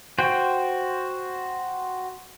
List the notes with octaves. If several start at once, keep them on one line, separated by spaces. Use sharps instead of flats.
F#4 C5 G5